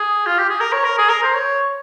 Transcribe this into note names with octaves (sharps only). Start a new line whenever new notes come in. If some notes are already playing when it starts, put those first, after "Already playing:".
Already playing: G#4
F4
G4
G#4
A#4
C#5
A#4
G#4
A#4
C5
C#5